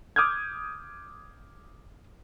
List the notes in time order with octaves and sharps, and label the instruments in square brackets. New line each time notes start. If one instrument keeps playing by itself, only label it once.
[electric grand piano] D6 D#6 F6 G6 G#6